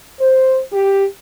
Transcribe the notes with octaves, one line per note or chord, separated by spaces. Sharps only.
C5
G4